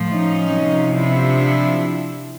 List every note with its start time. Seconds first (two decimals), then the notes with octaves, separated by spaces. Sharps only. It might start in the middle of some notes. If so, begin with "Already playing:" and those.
Already playing: A2 F3
0.11 C#4 D#4
0.53 C3 F3
0.95 D4 E4